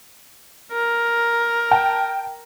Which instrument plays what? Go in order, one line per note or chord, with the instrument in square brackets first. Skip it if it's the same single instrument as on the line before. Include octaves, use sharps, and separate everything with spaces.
[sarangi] A#4
[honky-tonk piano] G5 A5